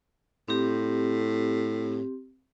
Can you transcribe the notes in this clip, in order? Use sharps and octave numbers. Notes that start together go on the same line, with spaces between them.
A2 C4 G4